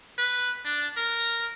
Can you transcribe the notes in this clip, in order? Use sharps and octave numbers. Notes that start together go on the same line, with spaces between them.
B4
D4
A#4